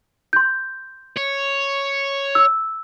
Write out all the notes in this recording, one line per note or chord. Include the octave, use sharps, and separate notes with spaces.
C6 G6
C#5
E6